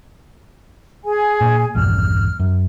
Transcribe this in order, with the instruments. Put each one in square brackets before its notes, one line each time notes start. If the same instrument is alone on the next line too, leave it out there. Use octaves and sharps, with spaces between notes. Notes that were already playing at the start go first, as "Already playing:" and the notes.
[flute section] G#4 G#5
[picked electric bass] A#2
[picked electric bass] A#1 E2 G2 [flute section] F6
[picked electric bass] F#2